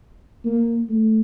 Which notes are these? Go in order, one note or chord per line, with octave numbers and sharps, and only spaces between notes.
A#3
A3